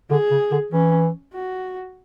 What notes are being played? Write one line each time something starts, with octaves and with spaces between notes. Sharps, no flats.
D3 G#4
C#3
D3
E3 C#4
F#4